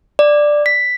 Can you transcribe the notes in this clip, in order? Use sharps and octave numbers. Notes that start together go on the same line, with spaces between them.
D5
B6